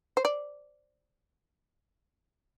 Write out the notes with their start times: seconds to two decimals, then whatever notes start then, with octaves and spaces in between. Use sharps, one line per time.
0.17 C5
0.25 D5